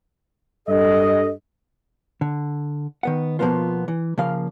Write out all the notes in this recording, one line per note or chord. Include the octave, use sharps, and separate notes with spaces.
G2 A4 D#5
D3
D#3 B3 F#5
B2 F3 G3 A#3 B3 F4
E3
C#3 F3 A#3 F5